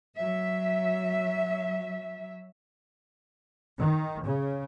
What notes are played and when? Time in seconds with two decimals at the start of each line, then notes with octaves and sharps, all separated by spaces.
0.19 F#3 E5
3.79 D#3
4.26 C#3